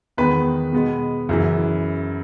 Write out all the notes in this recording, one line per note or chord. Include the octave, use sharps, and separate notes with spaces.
E2 D#3 G#3 B3 B4 B5
B2 G#3 B3
F#2 C#3 E3